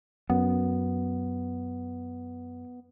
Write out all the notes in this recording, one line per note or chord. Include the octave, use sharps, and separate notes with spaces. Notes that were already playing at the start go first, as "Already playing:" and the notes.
F#2 B3